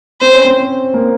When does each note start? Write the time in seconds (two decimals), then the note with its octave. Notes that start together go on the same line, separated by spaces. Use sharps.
0.21 C4 C5
0.33 C#4
0.45 C4
0.94 A#3